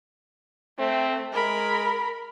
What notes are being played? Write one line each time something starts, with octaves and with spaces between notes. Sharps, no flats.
A3 C4
G#3 A#4 B5